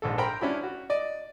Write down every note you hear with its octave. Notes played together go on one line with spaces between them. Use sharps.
A#1 G#2 A4
A#4 C5 G5 A#5 B5
C#4 D4 E4 F#4 B5
F#4
D5 D#5